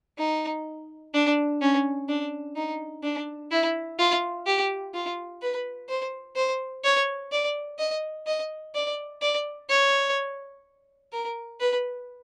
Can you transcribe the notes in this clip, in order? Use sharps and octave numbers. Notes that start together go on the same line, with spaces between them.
D#4
D4
C#4
D4
D#4
D4
E4
F4
G4
F4
B4
C5
C5
C#5
D5
D#5
D#5
D5
D5
C#5
A#4
B4